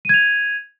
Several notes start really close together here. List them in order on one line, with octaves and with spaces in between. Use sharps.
D#7 G#6 F7